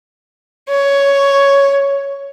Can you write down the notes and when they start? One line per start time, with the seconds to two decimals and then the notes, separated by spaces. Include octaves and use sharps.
0.70 C#5